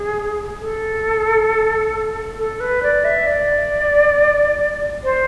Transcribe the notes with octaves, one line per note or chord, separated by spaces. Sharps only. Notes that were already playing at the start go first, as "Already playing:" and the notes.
Already playing: G#4
A4
A4
B4
D5
E5
D5
C5